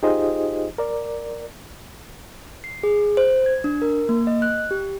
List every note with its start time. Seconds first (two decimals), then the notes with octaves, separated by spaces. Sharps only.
0.03 D#4 F4 G4 G#4 C5 D#5
0.78 A#4 D5
2.64 C7
2.83 G#4
3.17 C5
3.46 G#6
3.64 D4
3.82 A#4
4.09 A#3
4.27 D#5
4.42 F#6
4.71 G4